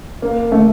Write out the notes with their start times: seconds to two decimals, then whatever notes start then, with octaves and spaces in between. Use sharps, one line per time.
0.22 A#3
0.52 A3